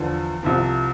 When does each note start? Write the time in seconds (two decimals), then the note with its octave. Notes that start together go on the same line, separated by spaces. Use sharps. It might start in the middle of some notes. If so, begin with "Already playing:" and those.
Already playing: E2 D3 F3
0.43 C2 C3 F3